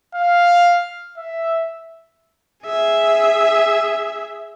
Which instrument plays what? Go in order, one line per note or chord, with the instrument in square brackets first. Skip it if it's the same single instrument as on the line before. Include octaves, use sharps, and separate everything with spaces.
[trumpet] F5
E5
[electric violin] G#4 E5